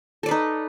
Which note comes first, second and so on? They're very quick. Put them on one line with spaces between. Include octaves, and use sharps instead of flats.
A4 D5 B4 D#4